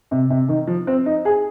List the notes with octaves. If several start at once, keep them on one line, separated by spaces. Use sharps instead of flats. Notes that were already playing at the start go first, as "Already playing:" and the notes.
C3
C3
D#3
F3
C4
D#4
G#4